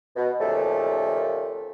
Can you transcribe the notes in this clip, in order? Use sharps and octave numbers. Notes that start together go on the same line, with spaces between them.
B2
D#2 A#2 C#3 F3 A3